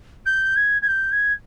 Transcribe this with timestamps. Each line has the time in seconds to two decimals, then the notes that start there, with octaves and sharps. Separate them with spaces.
0.25 G6
0.56 G#6
0.82 G#6
0.87 G6
1.12 G#6